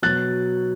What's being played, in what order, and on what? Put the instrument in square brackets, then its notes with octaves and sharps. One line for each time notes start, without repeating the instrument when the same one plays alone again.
[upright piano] B2 F#3 F#6 A6